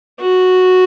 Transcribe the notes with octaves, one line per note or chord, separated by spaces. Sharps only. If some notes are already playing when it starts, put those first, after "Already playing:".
F#4